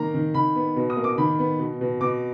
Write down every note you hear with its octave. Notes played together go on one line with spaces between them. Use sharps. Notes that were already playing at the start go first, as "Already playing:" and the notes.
Already playing: D#3 A#3 A#5
D#3
D#3 B5
B3
B2
D#6
A#3
D6
D#3 B5
B3
B2
B2
B2 D6